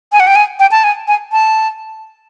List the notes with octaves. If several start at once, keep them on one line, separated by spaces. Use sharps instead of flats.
G#5
F#5
G5
G#5
G5
A5
G#5
G#5
A5